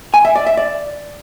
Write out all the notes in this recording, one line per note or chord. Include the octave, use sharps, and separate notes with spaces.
G#5
E5
D5
E5
D5